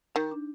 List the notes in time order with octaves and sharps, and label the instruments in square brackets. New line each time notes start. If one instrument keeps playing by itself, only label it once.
[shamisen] D#3 [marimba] D#4
[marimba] D4